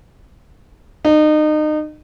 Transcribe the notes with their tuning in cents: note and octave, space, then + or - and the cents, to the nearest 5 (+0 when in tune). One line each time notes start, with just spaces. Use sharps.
D#4 -30